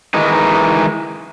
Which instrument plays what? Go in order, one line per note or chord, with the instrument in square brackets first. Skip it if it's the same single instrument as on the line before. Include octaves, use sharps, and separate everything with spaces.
[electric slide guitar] D#3 E3 G#3 D#4